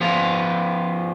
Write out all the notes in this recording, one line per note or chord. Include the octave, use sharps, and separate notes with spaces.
F3 B3 F4